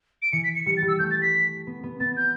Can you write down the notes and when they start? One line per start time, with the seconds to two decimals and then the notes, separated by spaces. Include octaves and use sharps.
0.22 D7
0.32 E3 C#7
0.44 B6
0.55 C#7
0.66 G3 C#7
0.77 A6
0.82 G3
0.88 E6
0.99 A3 G6
1.10 A6
1.22 B6
1.67 B3
1.83 B3
2.00 B3 A6
2.17 G6